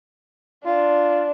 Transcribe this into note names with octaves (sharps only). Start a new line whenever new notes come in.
D4 F4